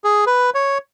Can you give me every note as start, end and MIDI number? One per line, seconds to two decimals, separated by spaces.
0.04 0.25 68
0.26 0.50 71
0.54 0.78 73